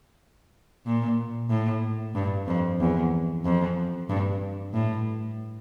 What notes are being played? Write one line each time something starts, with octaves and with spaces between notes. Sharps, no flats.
A#2
A2
G2
F2
E2
F2
G2
A2